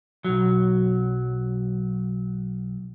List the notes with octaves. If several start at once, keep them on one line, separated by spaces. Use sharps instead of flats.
B1 F#3